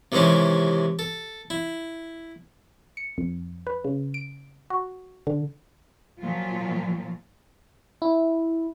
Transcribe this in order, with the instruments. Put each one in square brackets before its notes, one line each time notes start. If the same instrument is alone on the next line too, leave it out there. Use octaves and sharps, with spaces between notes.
[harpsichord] C3 D#3 E3 G#3 C#4 G4
A4
E4
[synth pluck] C#7
F2
B4
C#3
D7
F#4
D3
[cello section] A#2 F3 F#3 F4
[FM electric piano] E4